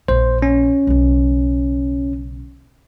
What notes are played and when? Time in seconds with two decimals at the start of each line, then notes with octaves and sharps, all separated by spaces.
0.08 A#1 C5
0.42 C#4
0.87 B1 C#3